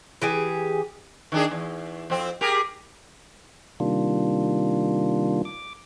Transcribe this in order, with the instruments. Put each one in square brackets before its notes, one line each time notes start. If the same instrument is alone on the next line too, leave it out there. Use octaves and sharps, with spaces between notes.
[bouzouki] E3 G4 G#4
[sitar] D#3 D4 G#4
E2
F2 C4
G4 G#4 A#4
[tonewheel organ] C3 D#3 G3 A#3 D4 F4
D6